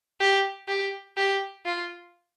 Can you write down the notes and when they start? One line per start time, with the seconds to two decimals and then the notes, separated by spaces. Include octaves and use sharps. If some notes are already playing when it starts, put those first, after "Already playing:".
0.20 G4
0.68 G4
1.17 G4
1.65 F4